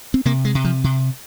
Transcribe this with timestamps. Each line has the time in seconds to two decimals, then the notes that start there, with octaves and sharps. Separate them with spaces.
0.14 C4
0.25 C3 A#3
0.45 G#3
0.55 C3
0.64 F3
0.84 C3